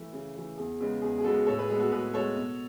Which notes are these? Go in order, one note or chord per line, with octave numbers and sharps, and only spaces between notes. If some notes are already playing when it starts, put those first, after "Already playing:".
Already playing: E3 A3
C#3
E3 A3
E2 G#4
C#3 G#3 B3
E2 G#4
G#4
C#3 G#3 B3 F#4 A4
A2 A4 C#5
G#4 B4
G#3 B3 G#4
F#4 A4
A2 G#4 B4
G#3 B3 A4 C#5
B2